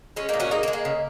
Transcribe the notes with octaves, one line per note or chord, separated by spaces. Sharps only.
G#3 C#4
A#2 A#3 D#4
C#4 F#4
G#3 A#3 D#4
A#3
G#3
A#3
C#3